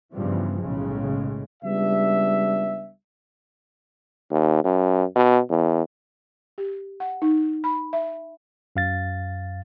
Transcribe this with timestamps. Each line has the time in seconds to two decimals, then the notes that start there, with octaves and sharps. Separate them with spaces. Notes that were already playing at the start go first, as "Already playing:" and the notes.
0.12 G2 C#3 E3 F3 B3
0.58 B1 A2 C#3 G#3
1.63 C#2 G3 B3 D4 E5
4.31 D#2
4.64 F#2
5.15 B2
5.50 E2
6.58 G4
7.00 F#5
7.22 D#4
7.64 B5
7.93 E5
8.76 F#2 F5 A6